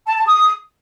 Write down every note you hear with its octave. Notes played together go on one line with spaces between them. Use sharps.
A5
A5
D#6